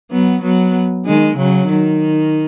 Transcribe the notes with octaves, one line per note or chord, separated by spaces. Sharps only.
F#3 B3
F#3 B3
D#3 G#3
C#3 F#3
D#3